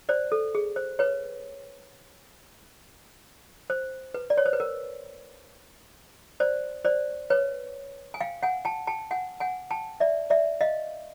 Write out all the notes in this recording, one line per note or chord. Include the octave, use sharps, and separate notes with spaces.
C5 D5
A4
G#4
C5
B4 C#5
C5
B4
D5
C#5
C5
B4
A#4
C5 D5
C5 D5
B4 C#5
G#5
F5 G5
F#5 G#5
G5 A5
G5 A5
F#5 G#5
F#5 G#5
G5 A5
D5 E5
D5 E5
D#5 F5